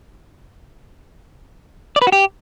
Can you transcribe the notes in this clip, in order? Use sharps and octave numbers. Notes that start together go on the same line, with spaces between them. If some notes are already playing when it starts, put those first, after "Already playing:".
D5
B4
F#4
G4